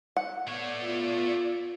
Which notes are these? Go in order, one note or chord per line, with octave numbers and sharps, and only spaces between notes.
F#5
A3 B3 C#5 D5
F4